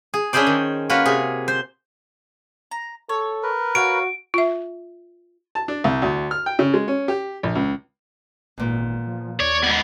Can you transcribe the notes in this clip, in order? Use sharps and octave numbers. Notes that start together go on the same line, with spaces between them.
G#4
C#4 D4 E4 G#4 C5 D5
D#3
A#3 C#4 F4 F#4 B4
C3 G#4 G#5
C5
A#5
A4 C#5
A#4 B4
F#4 C#5 F5 F#5 D7
F4 E5
A5
D4
C2
D2
F6
G5
C#3
G#3
C#4
G4
A#1
C#2
G#1 E2 A#2
F3
D#2 C#5 D5 G#6
G#2 B3